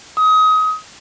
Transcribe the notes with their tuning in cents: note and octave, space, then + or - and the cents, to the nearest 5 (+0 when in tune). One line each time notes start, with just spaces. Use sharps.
D#6 +25